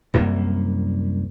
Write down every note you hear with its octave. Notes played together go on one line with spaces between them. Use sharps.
C2 F#2 A#3